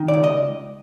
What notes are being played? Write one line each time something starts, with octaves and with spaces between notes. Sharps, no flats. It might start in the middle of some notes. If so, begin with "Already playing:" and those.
Already playing: D#3
D5
C#2
D#5